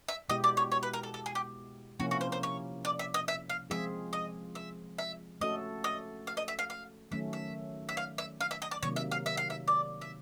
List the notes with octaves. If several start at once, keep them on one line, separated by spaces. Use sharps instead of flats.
E5
B2 G#3 B3 E4 G4 D#5
D5
C#5
C#5
B4
A#4
A4
A4
G#4
G4
C3 F3 A#3 C#4 E4 F#4
F#4
C5
C5
C#5
D5
E5
D#5
E5
F5
F3 G#3 C4 F4 G#4 E5
D#5
E5
E5
A3 C#4 F#4 A4 D#5
D#5
F5
D#5
E5
F5
F5
D#3 F#3 A3 C#4 E5
E5
E5
F5
E5
F5
E5
D#5
D5
C3 D#3 F#3 A#3 C#5
E5
F5
E5
F5
E5
D5
E5